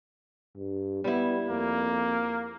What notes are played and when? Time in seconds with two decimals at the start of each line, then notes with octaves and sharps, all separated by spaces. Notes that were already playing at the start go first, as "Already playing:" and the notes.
0.56 G2
1.04 G3 B3 E4
1.48 F2 A#3